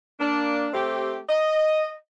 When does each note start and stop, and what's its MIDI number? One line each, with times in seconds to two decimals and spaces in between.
0.20 0.68 58
0.20 0.68 62
0.72 1.19 57
0.72 1.19 60
0.72 1.19 67
1.29 1.95 75